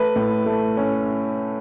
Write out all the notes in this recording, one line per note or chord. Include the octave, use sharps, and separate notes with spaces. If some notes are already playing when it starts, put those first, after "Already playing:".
Already playing: A3 B4
A2
A3
C#4